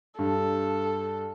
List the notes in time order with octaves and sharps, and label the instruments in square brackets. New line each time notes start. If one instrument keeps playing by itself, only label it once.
[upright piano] G2 [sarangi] A4